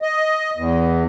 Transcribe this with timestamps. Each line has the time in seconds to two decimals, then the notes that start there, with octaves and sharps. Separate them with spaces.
0.02 D#5
0.58 E2